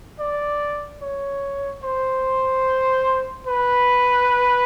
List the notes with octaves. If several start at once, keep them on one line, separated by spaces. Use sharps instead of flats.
D5
C#5
C5
B4